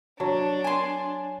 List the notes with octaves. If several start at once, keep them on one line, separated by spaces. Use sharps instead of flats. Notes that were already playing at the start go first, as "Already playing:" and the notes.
F#3 D4 C#5 A5
G#5 C6